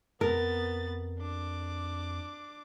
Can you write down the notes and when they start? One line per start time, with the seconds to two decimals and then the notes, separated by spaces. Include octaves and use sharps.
0.21 F2 B3 A#4 A6
1.19 D4 D6